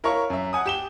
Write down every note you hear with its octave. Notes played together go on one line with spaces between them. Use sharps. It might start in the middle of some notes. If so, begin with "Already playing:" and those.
E4 A#4 C#5 F5 A#5 C#6
F#2 E5
F#5 G#5 D#6
G4 E7 G7